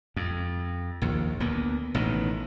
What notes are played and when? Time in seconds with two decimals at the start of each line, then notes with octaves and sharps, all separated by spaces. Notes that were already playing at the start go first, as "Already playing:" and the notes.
0.16 F2
1.02 A#1 D#2
1.40 D2 A#3 B3
1.95 A1 B2 D#3